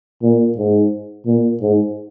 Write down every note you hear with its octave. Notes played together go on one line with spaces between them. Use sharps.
A#2
G#2
A#2
G#2